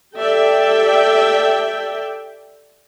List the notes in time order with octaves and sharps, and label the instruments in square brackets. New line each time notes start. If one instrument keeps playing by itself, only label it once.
[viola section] G4 A4 D5 E5 G5